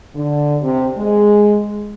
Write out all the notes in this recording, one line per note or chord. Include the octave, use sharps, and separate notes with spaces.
D3
C3
G#3